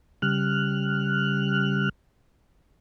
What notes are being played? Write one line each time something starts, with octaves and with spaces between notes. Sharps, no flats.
C#3 G3 F6 F#6